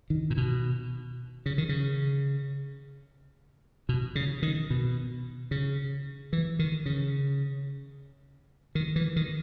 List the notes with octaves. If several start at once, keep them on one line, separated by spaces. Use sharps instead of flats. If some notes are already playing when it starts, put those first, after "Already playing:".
D#3
A#2
B2
C#3
D#3
C#3
B2
C#3
D#3
B2
C#3
E3
D#3
C#3
D#3
E3
D#3